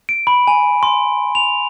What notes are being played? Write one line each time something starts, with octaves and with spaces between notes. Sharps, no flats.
D7
B5
G#5
C6
F7